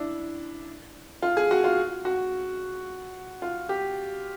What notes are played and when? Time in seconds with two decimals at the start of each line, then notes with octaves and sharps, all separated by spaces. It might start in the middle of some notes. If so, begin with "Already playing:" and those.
Already playing: D4 E4
1.23 F4
1.37 G#4
1.51 F#4
1.64 F4
2.05 F#4
3.42 F4
3.69 G4